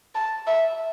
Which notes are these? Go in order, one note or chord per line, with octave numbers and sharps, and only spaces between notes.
A5
E5